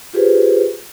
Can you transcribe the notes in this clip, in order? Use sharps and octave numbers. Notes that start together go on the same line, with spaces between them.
F4 G4 G#4 B4 C5